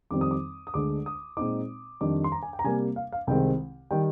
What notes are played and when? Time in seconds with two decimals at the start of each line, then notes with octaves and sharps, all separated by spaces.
0.11 F2 D#3 G3 C4 D#4 D6
0.21 D#6
0.31 D6
0.67 D#6
0.74 D2 D3 G#3 D4 D6
1.06 D#6
1.37 A#2 G#3 C4 D#4 D6
2.01 F2 D#3 G3 D4 D6
2.24 C6
2.32 A#5
2.43 G#5
2.53 G5
2.59 A#5
2.64 C3 G3 A#3 G#5
2.96 F5
3.12 F5
3.27 C2 C3 D#3 G#3 C4 G5
3.91 D#3 G3 G5